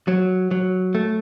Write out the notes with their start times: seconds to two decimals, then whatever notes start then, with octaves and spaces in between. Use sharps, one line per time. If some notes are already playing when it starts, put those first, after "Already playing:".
0.08 F#3
0.51 F#3
0.95 A3